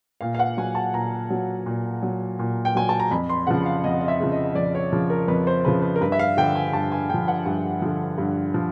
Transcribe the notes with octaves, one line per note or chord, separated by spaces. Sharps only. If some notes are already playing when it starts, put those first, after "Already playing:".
A#2 F5
F5
F#5
F#3 G#5
A5
A#2 A#5
F#3
A#2
F#3
A#2
G5
F#3 G#5
A5
A#5
F2 B5
C6
C#3 F3 F#5
F5
F2 D#5
D#5
E5
C#3 F3
D#5
F2 D5
C#5
C#3 F3
A#4
F2 B4
C5
C#3 F3 B4
B4
A#4
G2 B4
E5
F5
D3 F3 G5
G#5
G2 A5
G#5
D3 F3 G5
F#5
G2 G#5
D3 F3
G2
F3